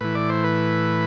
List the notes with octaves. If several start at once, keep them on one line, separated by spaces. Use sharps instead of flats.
A2 E3 B4
D5
C5
B4